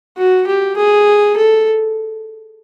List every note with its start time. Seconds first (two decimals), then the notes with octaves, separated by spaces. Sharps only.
0.17 F#4
0.47 G4
0.77 G#4
1.37 A4